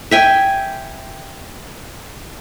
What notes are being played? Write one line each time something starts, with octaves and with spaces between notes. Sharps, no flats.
E5 G5 G#5